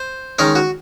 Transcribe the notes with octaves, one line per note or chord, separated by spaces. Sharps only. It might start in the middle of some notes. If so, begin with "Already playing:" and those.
Already playing: C5
D#3 G#3 C#4 A#4
F#4